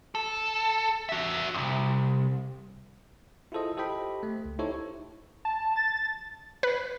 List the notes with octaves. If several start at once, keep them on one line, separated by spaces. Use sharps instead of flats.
A4
F#4 E5
C2 F2
E4 F4 G#4 A4 C5 D#5
G4 A4 C5 D#5 G5 B5
A3
C#2
D#4 E4 G4 A4 C5 C#5
A5
A6
B4